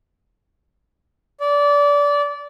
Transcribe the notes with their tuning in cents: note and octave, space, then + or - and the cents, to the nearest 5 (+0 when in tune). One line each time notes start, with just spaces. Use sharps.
D5 -25